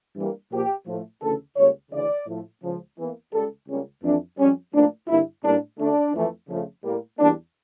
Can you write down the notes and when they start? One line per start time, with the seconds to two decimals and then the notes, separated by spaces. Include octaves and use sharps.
0.16 G2 E3 G3 A#3
0.51 A#2 F3 A#3 G4
0.86 A2 F3 A3
1.22 D2 C#3 E3 A3 A4
1.56 C#2 C#3 G3 A#3 C#5
1.92 D2 C#3 E3 D5
2.27 A2 F3 A3
2.62 C#2 C#3 F3
2.97 E2 E3 A#3
3.33 C#2 C#3 G3 A4
3.67 C#2 C#3 G3 A#3 C#4
4.03 F2 E3 A3 D4
4.38 F2 C#3 G3 C#4
4.73 A2 F3 A#3 D4
5.08 G2 D3 G3 A#3 E4
5.43 A2 G3 A#3 D4
5.79 D2 D3 A3 D4
6.14 F2 E3 A3
6.49 F2 C#3 F3 A3
6.84 A2 G3 A#3
7.19 E2 E3 G3 A#3 D4